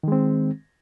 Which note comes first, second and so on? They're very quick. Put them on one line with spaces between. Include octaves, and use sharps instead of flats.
D#3 G#3 C4